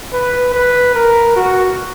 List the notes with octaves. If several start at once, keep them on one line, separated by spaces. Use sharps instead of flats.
B4
B4
A#4
F#4